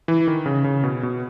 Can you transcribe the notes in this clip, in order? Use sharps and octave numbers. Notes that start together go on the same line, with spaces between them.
E3
D#3
C#3
C#3
B2
B2